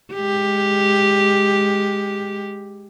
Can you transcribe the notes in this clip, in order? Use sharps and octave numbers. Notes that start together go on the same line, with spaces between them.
G#3 G4